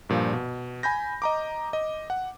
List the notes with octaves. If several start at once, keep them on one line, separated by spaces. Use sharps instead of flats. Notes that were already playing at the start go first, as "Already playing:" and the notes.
G2 A#2 F3
B2
G#5 B5 G6 A#6
D#5 A#5 D6
D#5
F#5